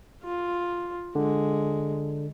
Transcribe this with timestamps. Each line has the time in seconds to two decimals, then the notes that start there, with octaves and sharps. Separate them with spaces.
0.24 F4
1.15 D3 G#3